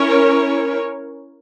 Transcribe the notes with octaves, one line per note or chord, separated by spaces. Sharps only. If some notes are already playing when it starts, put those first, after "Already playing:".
Already playing: C#4 E4 A#4 C#5